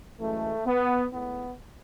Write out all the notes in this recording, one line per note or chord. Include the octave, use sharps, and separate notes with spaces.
F#2 E3 G#3 A3
B3
A2 G#3 B3